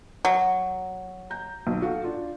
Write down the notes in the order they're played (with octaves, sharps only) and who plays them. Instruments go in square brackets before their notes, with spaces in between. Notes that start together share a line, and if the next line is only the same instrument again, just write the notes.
[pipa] F#3
[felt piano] A#5 G6
B1
F#4 A4 F5
D4 F4